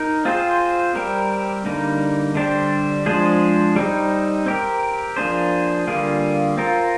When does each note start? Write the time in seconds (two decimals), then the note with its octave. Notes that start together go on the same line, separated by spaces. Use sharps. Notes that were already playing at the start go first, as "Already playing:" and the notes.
Already playing: D#4 A#4
0.25 C4 F4 G#4 C5
0.95 G3 C4 G4 A#4
1.66 D3 G3 A#3 D#4
2.35 D3 G3 D4 G4 C5
3.06 F3 G#3 D4 G#4 C5
3.76 G3 C4 D#4
4.46 C4 G4 A#4
5.17 F3 A#3 D4 G#4 C5
5.87 D3 G3 A#3 F4 G#4
6.57 C4 F4 A#4